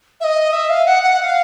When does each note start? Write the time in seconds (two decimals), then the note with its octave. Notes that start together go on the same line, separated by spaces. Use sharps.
0.20 E5
0.24 D#5
0.53 E5
0.70 F5
0.86 F#5
1.03 F#5
1.19 F#5
1.24 F5